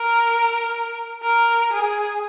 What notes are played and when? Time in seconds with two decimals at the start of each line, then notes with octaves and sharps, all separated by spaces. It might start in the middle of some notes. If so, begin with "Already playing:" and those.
Already playing: A#4
1.22 A#4
1.73 G#4